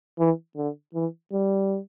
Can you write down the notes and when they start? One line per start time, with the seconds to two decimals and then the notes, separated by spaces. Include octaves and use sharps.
0.19 E3
0.57 D3
0.94 E3
1.33 G3